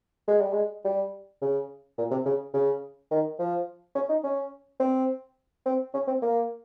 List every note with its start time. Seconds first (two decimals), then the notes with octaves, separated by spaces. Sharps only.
0.28 G#3
0.41 G3
0.53 G#3
0.84 G3
1.41 C#3
1.98 A#2
2.11 C3
2.25 C#3
2.54 C#3
3.11 D#3
3.39 F3
3.95 C#4
4.09 D#4
4.24 C#4
4.80 C4
5.66 C4
5.94 C#4
6.07 C4
6.22 A#3